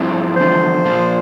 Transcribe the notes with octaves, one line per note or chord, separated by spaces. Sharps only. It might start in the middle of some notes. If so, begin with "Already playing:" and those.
Already playing: G2 F3 C4 E4
E2 D3 F3 C5
A#2 F3 A#3 F4